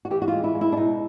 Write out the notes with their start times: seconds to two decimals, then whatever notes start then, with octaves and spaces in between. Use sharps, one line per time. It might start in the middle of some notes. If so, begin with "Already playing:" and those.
0.05 F#4
0.10 E3 G4
0.22 F#4
0.28 G#3 F4
0.44 E4
0.55 G#3
0.61 E4
0.72 D4
0.77 B2 D#4